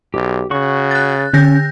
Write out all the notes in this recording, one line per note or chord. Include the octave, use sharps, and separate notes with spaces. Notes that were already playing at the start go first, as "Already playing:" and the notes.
B1 G4
C#3 F#4 C#6
F#6 A6
D3 C#4 G6 A#6